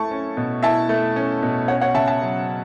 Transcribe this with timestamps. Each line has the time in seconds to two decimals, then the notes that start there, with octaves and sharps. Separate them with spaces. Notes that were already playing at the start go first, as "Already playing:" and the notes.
Already playing: A3 E4 A5 C#6
0.11 C#4
0.37 B2
0.63 E4 E5 A5
0.89 A3
1.16 C#4
1.43 B2
1.68 C#4 C#5 F#5
1.81 C#5 F#5
1.94 C#3 E5 A5
2.07 E5 A5
2.22 F#3